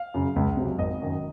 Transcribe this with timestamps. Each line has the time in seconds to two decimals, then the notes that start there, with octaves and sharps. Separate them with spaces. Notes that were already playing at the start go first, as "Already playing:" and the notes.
Already playing: F5
0.14 F#2 C#3
0.36 C#2
0.57 C3 F#3
0.79 G#1 D#5
1.02 F#2 D#3